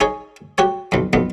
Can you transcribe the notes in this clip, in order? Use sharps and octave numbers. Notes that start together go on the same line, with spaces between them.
D#4 G#4 C#5
F#4 G4 C#5
B1 F2
B1 F2 B3